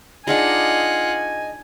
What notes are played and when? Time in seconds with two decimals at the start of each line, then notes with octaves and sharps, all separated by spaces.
0.27 D4 D#4 F4 G#4 D#5 F#5 G#5